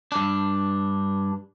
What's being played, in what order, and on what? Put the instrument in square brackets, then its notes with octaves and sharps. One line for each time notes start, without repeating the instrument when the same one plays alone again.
[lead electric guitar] G2 D4